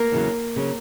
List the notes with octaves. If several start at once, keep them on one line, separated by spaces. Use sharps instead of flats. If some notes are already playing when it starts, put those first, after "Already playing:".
Already playing: A#3 A#4
E2 C#3 F#3
C#3 F#3